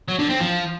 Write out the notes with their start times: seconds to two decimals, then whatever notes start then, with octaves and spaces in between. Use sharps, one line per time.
0.08 F#3
0.19 D3
0.30 C4
0.40 F3